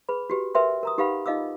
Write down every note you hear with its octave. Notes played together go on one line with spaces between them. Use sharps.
G#4 B4 B5
F#4 G4 B4
A#4 B4 E5 G5 C6
A#4 A#5 D#6
D#4 G4 B4 F5 F#5 B5
D#4 F4 D#5 F5 D6 E6